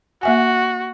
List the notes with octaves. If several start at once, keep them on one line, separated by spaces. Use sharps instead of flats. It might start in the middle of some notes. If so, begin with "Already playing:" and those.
A#3 F#4 E5 G#5